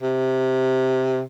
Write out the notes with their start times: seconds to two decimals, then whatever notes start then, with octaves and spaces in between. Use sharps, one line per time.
0.02 C3